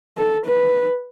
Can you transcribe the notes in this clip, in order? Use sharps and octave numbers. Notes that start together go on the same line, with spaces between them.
A4
B4